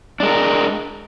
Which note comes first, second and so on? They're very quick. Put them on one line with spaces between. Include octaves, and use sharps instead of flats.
D4 G#3 A#4